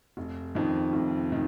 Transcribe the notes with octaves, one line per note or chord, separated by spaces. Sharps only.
F1
F2 D#3
F1
D#3